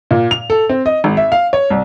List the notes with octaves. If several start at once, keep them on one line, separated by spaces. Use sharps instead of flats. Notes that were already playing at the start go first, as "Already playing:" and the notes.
A#2
F7
A4
C4
D#5
G#1
E5
F5
C#5
C2